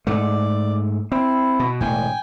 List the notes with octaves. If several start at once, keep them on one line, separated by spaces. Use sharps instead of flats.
G#2 A3 D5
C4 E4
B2
E1 A2 G5 G#5